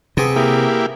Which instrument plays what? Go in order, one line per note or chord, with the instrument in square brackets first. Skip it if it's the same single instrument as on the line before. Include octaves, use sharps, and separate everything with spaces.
[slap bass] C3 [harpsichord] B3 C4 G#4
[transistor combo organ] A#3 E4 G4